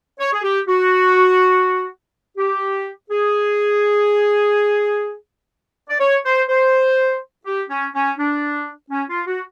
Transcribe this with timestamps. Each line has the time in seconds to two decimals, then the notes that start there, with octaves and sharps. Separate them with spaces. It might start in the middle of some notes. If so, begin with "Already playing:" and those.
0.20 C#5
0.33 G#4
0.43 G4
0.68 F#4
2.38 G4
3.10 G#4
5.90 D5
6.00 C#5
6.25 C5
6.49 C5
7.45 G4
7.70 C#4
7.95 C#4
8.19 D4
8.91 C#4
9.09 F4
9.27 F#4